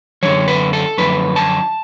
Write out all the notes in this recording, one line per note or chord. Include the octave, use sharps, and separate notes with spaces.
F#2 D3 F3 C#5
B4
A4
F#2 D3 F3 B4
A5